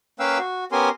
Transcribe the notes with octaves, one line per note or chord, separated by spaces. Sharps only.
A#3 C#4 B4 F5 G5 E6
F#4
B3 C#4 G4 A#4 G#5 C6